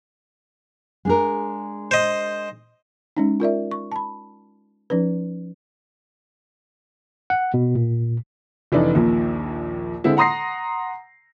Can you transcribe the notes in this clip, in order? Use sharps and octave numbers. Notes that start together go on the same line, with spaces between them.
G#3 D4 A#4
C5 D#5
G#3 C#4 D#4
F4 A#4 D5 E5
C#6
A5 B5
F3 C#4 D#4 B4
F#5
B2
A#2
F1 E3 D4 D#4 D5
A#1 D#2 A#2
D3 G#3 C4 E4 A4
F#5 A#5 C6 D#6 A#6 C7